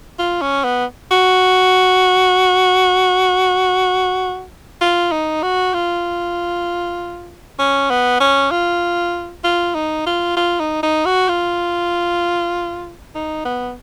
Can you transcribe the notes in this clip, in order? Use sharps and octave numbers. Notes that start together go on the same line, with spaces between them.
F4
C#4
B3
F#4
F4
D#4
F#4
F4
C#4
B3
C#4
F4
F4
D#4
F4
F4
D#4
D#4
F#4
F4
D#4
B3